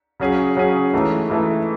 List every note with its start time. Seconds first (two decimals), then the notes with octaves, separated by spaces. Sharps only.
0.20 C#3 F#3 C#4 G#4
0.57 C#3 F#3 C#4 G#4
0.94 G#2 E3 A3
1.30 G#2 E3 A3